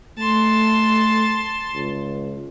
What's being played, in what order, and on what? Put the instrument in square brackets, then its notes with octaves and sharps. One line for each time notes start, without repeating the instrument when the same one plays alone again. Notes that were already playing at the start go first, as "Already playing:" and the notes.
[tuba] A3 [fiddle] A5 C6
[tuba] C#2